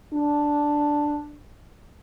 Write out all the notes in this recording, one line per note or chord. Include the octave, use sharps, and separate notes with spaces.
D4